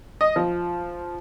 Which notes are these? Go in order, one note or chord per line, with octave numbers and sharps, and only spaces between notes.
D#5
F3